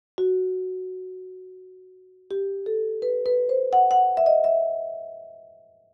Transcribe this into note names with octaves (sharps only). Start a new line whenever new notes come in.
F#4
G4
A4
B4
B4
C5
F#5
F#5
E5
D#5
E5